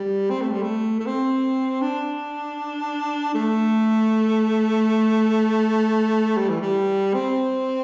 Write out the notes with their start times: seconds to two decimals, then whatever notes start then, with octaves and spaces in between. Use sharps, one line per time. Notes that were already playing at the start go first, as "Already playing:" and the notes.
Already playing: G3
0.30 C4
0.41 A3
0.51 G3
0.62 A3
0.99 A3
1.06 C4
1.82 D4
3.34 A3
6.37 G3
6.49 E3
6.62 G3
7.14 C4